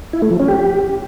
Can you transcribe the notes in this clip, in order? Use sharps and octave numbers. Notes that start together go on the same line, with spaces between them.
E4
A3
F3
C#4
G4